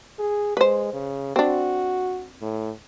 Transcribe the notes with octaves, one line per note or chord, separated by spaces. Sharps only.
G#4
G#3 B4 C5
C#3
C4 D4 F#4
A2